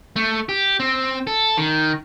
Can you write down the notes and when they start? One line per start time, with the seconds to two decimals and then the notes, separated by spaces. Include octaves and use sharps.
0.16 A3
0.49 G4
0.80 C4
1.27 A4
1.57 D#3